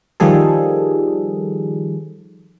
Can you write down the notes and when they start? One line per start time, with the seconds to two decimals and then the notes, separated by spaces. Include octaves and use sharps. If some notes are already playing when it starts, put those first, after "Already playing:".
0.20 D#3 F3 G3 G#4 A4